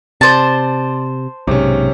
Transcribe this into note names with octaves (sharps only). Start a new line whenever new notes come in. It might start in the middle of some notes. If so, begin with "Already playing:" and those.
C3 C5 D5 A5
B1 G#2 C3 C#4